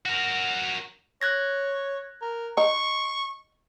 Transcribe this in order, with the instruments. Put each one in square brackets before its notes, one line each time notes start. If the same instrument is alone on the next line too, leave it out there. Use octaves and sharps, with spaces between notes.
[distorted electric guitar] F#4 A#4
[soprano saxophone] C#5 [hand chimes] F#6 G#6 A#6
[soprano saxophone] A#4
[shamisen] D#4 [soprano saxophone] C#6